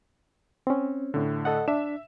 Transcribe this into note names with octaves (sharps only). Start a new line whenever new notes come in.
C4 C#4
A2 D3
A4 D#5 F#5
D4 E5 E7